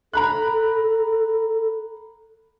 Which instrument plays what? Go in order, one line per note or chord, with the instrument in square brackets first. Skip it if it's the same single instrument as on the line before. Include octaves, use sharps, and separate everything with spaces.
[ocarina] A4 [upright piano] A#5 B5 F#6